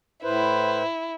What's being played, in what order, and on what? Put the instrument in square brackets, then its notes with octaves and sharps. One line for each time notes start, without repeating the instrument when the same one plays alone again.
[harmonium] A2 B4 C5 [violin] E4